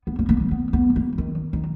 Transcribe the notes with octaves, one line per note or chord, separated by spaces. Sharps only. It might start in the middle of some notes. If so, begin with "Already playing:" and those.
B3
A#3
A#3
A#3
B3
B3
A#3
D#3
D#3